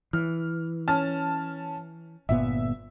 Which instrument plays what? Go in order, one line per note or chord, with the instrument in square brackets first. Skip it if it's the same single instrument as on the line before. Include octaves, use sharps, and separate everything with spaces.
[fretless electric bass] E3 [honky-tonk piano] F6
[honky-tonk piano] C#4 A5 F6
[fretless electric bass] G1 A#2 B3 [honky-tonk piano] E5